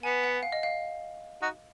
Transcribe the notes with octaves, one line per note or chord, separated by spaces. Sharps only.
B3 G#5
F#5
F5
D#5
F5
D#4 F#4